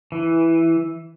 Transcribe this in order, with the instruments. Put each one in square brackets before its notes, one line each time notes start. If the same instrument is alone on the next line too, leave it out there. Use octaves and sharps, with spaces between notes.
[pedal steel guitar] E3